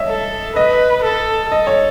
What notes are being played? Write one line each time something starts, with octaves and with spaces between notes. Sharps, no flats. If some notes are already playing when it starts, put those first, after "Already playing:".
Already playing: C#5 D#5 E5
A4
B4 D#5
A4
A4 D#5
C#5